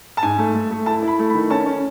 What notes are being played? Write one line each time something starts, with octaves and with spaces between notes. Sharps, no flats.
A5
G#2 G#5
A3
A3
A3
E4 A5
E4
B5
A3
B5
D#3
C#4 A5
C#4